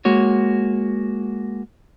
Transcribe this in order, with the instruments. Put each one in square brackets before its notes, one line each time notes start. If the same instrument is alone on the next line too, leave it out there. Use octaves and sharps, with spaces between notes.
[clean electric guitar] G#3 A#3 F#4 C#5